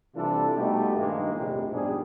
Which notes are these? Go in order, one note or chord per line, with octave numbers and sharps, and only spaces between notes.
C3 E3 G3 D4 F4 A4
B2 G3 A3 B3 D#4 G4
A#1 G2 D#3 G#3 A#3
A#1 F2 A2 C3
A#1 G#2 B2 G3 D4 G#4